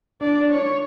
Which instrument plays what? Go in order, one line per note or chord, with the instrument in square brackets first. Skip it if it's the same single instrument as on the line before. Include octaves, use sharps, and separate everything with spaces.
[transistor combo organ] D4 [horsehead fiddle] D5
[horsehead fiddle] C#5